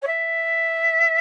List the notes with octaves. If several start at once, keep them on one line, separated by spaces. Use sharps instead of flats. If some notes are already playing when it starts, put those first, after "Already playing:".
C#5
E5